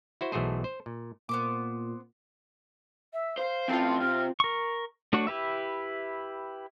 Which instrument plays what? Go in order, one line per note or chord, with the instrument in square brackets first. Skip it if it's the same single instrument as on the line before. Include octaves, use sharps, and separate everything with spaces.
[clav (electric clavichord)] E4 F#4 C5
B1 E3 A3 F#4 G#4 C5
C5
A#2
[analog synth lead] A#2 [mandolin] B3 C5 D6
[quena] E5
[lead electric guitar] C5 [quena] F5
[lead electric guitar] E3 A4 [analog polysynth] C4 F4
[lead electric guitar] C3 [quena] F6
[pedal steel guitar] A#4 C#6
A3 D4 F#4 C#5 F#5
E4 G4 B4 E5